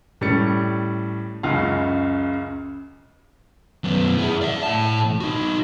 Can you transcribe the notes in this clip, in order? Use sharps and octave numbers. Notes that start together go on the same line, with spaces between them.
A2 G3 C#4 A6 C#7
C#2 F#2 C#3 F4 F5 F#5
F#2 B3
E4 G#4
D5 E5
A2 A5
D#4 F#4